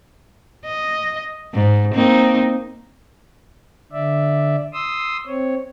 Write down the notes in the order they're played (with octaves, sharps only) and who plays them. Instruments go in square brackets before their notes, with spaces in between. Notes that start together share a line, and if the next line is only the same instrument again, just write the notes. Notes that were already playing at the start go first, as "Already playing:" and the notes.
[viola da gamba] D#5
G#2
A#3 C4 D#4
[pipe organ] D3 D5 E5
C6 D#6 E6
C4 C#5